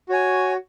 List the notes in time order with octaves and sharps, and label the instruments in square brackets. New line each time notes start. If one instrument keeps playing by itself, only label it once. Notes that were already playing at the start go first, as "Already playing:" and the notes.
[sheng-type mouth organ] F#4 C#5 G#5